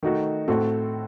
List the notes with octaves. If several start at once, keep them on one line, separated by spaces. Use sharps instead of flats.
D#3 A3 D#4 F#4
A2 A3 C4 F#4 A4